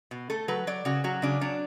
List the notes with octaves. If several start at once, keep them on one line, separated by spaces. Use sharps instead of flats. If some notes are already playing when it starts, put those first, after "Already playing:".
B2
A3 A4
F#3 B4
F#3 D5
C#3 F#4
F#3 F#4
C#3 D4
F#3 D4